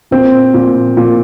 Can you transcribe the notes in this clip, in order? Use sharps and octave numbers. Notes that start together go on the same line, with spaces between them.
A#2 C4
A#2
A#2